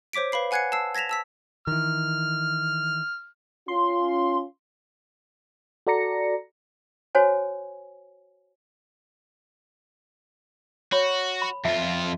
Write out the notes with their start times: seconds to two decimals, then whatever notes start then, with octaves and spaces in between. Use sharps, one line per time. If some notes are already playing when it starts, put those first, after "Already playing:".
0.13 C5 C#5 D6 B6 D7
0.32 B4 F5 B5 C7
0.51 F#5 G#5 F#6 G#6 C7 C#7
0.72 A5 E6 C7
0.95 G#6 A#6 B6 E7 F7
1.09 A5 E6 B6
1.67 D#3 E3 F6
3.68 C#4 F4 C6
5.87 F#4 A4 D5 A#5 A#6 C#7
7.15 F#4 C5 C#5 G#5 A5
10.92 F#4 C#5 B5
11.42 B5
11.65 F2 F4 E5 A5